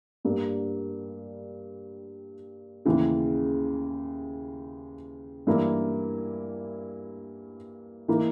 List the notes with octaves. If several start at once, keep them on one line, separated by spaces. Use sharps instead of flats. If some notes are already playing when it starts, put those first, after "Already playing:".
G2 G3 A#3
D#2 C#3 E3
G2 E3 A#3 E4
E3 A#3 D#4